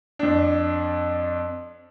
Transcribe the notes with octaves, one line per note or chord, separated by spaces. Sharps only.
F2 D4